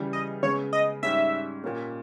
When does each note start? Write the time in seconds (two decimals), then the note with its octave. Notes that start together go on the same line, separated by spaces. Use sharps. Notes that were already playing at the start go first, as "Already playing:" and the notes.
Already playing: C#3 E3 G3
0.13 D#5
0.43 C#3 G#3 B3 C#5
0.73 D#5
1.03 G#2 G3 C#4 E5
1.63 A#2 A#3 C#4 G4